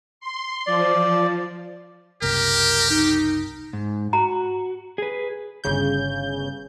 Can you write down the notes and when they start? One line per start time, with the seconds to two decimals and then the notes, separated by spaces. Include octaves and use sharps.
0.20 C6
0.67 F3 D5
2.22 F#1 C2 G4 A#4
2.90 D#4
3.73 G#2
4.13 F#4 A#5
4.98 G#4 B4
5.64 G1 C#3 G6